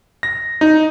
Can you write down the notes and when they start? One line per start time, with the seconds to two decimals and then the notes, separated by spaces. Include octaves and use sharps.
0.23 A#6
0.61 D#4